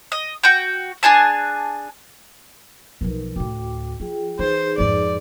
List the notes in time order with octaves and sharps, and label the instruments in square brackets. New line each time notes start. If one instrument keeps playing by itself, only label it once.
[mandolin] D#5
F#4 G5
D4 G#4 G#5 A5
[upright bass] B1 F3 [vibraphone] D#4 A#4 B4
[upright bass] D2 A2 [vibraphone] F#4 G5 D6
[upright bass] F3 [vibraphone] F4 G#4 G5
[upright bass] E3 [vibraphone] D#4 G#4 B4 [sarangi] C5
[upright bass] F2 G#2 [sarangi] D5